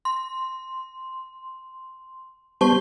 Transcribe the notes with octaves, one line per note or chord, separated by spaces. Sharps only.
C6
G3 B3 C5 A5 C#6 G7